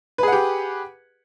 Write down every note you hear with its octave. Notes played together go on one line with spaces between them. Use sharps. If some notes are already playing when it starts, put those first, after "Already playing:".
G4 G#4 B4 F#5